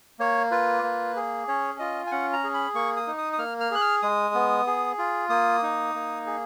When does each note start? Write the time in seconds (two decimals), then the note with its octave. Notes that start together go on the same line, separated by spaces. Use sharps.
0.19 A#3 C#5
0.51 F4 B4
0.83 A#3
1.16 G#4
1.48 C#4 C#5
1.79 F4 D#5
2.06 G#5
2.11 C#4 F#5
2.33 A#5
2.44 G#4
2.54 B5
2.74 A#3 C#6
2.97 D#6
3.07 D#4
3.18 D#6
3.33 D#6
3.38 A#3 F6
3.60 F6
3.71 G#4 F#6
3.81 F6
4.02 G#3 D#6
4.34 B3
4.67 G#4
4.98 F4
5.30 A#3 D#6
5.63 D#4
5.95 A#3
6.26 G#4